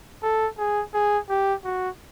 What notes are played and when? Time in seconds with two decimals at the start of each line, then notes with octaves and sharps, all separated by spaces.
0.23 A4
0.58 G#4
0.93 G#4
1.29 G4
1.64 F#4